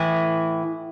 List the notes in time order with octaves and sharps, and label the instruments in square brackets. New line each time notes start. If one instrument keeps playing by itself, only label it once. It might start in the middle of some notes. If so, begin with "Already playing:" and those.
Already playing: [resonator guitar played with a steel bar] A2 E3 E4